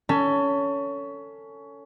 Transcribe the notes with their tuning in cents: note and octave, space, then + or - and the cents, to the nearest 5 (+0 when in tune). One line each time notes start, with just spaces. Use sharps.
C#4 +20 A4 +25